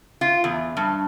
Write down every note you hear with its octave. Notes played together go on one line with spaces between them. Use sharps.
F4
E2
G2